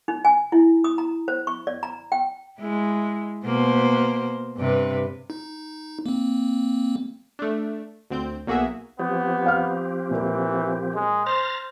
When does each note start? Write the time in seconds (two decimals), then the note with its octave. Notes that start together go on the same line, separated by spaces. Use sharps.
0.08 D#4
0.25 G#5
0.52 E4
0.84 D#6
0.98 A#5
1.28 C5
1.47 C#6
1.67 D5
1.83 A#5
2.12 G5
2.59 G#3 E4
3.44 B2 A#3 C5
4.57 G2 C3 B4
5.30 D#4
6.06 A#3 C4
7.39 A3 D4
8.10 D2 C4 G6
8.47 B1 A#3 F#4 G#4 E5
8.99 F3 B3 C4 G4
9.46 F5 F6
10.10 A#2 E3 A#3
10.95 G#3
11.26 C5 A#5 F6 A6